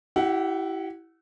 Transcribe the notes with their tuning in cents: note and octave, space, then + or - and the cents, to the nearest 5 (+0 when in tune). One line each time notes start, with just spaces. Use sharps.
E4 +0 G4 -35 F#5 +0